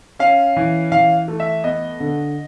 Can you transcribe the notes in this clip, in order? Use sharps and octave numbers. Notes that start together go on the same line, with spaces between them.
C#4 F5
E3
E3 F5
A3
E5
B3 D#5
D3